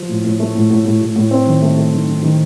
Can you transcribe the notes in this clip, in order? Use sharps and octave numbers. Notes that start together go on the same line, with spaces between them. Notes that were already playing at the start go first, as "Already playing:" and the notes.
Already playing: F3
A2
A2
A3
A2
A2
A2
A2
A2
C4
D#3
A3
A3
D#3
D#3
D#3